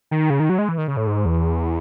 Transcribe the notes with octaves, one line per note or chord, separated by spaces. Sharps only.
D#3
C#3
D#3
F#3
G#3
E3
D#3
C#3
A2
G#2
E2